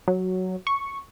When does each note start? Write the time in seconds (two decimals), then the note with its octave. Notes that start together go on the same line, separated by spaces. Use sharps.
0.08 F#3
0.67 C#6